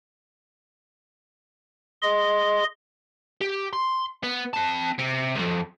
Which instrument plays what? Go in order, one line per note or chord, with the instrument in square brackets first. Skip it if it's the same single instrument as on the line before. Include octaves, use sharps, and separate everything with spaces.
[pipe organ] G#4 D#5 C6
[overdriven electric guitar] G4
C6
B3
C4 A5
C3
C2 F2